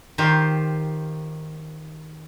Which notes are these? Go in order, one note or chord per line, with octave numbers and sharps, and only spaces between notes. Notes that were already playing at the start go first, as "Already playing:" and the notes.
D#3 F4 G4 C5